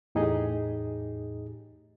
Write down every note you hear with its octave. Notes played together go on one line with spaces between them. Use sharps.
E2 A2 D#4 G4 G#4 D#5